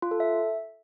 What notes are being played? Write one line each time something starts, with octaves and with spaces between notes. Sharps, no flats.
F4
A4
E5